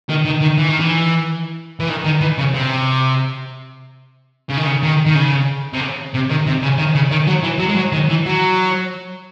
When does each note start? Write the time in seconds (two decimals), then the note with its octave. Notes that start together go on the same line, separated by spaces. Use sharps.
0.09 D#3
0.25 D#3
0.41 D#3
0.58 E3
0.69 D#3
0.80 E3
1.80 E3
1.89 D#3
2.04 D#3
2.21 E3
2.38 C#3
2.54 C3
4.50 C#3
4.57 D#3
4.66 C#3
4.83 D#3
5.06 D#3
5.15 C#3
5.73 C3
5.80 C#3
6.14 C3
6.29 D#3
6.46 C3
6.63 C#3
6.78 D#3
6.95 C#3
7.11 D#3
7.27 F#3
7.43 E3
7.60 F#3
7.69 G#3
7.76 F#3
7.92 D#3
8.09 E3
8.26 F#3